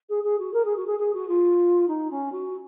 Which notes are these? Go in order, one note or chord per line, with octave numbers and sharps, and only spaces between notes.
G#4
G#4
F#4
A#4
G#4
F#4
G#4
G#4
F#4
F4
D#4
C#4
F#4